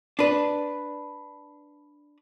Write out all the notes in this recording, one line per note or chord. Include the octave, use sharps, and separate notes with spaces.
D4 B4